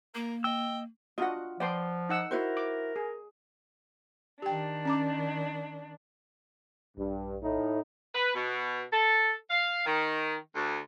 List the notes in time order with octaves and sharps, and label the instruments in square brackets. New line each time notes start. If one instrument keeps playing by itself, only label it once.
[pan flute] A#3 [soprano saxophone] A#4
[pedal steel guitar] D#5 E6 [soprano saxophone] G5
[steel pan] D4 F#4 D#5 [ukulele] F4 F#5
[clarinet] F3 [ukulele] B4 F#5 [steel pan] D5 G5 C6
[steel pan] D#4 F#5 E6
[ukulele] E4 F#4 C5 [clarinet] A#4
[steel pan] D6
G#4
[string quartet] D#3 D4 [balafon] G4 G5
[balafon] C#4 A#5 D6
[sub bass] A#1 [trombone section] G2
[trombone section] A2 D#4
[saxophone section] B4
B2
A4
F5
D#3
D2